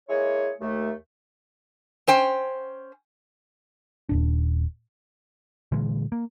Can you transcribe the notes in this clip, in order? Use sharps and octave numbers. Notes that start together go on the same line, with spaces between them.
G#3 A#3 E4 G#4 C#5
D#2 A3
C#4 C5 G5
D#1 G#1 D4
A#2 D3 E3 G#3
A#3